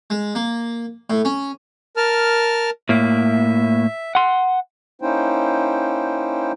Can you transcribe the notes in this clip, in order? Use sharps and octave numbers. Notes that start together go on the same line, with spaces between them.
G#3
A#3
A2
C#4
A#4 A5 F6
A2 A#3 E5
F#5 C6
A#3 C#4 D#4 E4 C5 G5